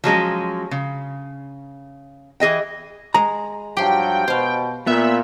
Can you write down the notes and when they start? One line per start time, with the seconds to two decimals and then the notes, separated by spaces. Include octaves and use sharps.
0.04 F3 F#3 G#3 C#4
0.71 C#3
2.40 E3 G#4 D#5 G5
3.14 G#3 D#5 A#5
3.77 G2 F3 F#3 G4 G5 C6
4.28 B2 C5 F5
4.87 A#2 B3 E5